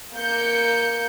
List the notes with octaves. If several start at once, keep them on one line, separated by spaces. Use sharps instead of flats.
A#3 G6 C#7